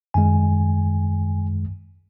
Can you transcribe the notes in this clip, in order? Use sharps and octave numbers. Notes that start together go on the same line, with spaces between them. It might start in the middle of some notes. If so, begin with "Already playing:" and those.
F#2 D#3 G#3 G#5